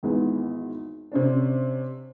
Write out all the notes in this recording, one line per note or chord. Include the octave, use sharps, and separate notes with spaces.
G#1 E2 G#3 B3
C3 C#4 D4